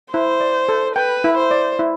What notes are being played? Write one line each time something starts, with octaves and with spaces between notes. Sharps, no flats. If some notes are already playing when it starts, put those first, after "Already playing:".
E4 C5
D5
A4
B4 G5
E4
C5
D5
E4